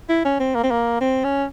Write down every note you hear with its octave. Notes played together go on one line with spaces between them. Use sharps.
E4
C#4
C4
A#3
C4
A#3
C4
C#4